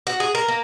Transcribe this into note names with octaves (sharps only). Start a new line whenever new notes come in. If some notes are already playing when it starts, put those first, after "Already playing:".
F#4
G#4
A#4
A#3